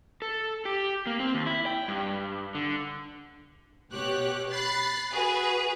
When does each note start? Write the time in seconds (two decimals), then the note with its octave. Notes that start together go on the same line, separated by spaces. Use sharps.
0.22 A4
0.65 G4
1.07 A#3
1.20 C4
1.35 D#2
1.46 E4
1.66 G5
1.88 G2
2.55 D3
3.93 B2 G4 C#5 F#6
4.51 B5 F#6 A6 C7
5.13 F#4 G#4 B4